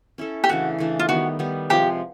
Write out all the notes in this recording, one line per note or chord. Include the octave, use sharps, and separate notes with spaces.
C#4 E4 A4
G4
C#3 E3 A3 D4 F#4
C#3 E3 A3 D4
F4
D#3 G3 B3 F#4
D#3 G3 B3
C3 F3 G#3 G4